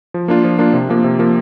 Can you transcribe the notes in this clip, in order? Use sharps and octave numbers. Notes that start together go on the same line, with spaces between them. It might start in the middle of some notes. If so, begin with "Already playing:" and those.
F3
A#3 D4 F4
F3
A#3 D4 F4
C3
F3 A#3
C3
F3 A#3